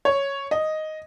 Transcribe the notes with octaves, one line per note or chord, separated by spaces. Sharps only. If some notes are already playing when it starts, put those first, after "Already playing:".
C#5
D#5